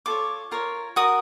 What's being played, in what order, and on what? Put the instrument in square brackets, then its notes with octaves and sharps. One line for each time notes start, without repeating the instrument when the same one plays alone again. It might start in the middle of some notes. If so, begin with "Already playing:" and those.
[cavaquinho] F4 A4 C#5 D6
F4 A#4 C#5
F#4 A#4 D#6